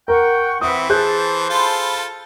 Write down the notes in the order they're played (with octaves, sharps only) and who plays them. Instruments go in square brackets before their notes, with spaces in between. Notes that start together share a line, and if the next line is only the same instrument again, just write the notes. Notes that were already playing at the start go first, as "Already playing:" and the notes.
[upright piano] A#4 [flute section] F#5 C#6 [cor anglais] G5
[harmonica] E3 [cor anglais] C4 [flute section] B4 E5 F#5 [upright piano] D#6
[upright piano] G#4 F#6 G6 [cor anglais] C5 [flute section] A5
[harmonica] F4 A4 [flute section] A5 B5 C6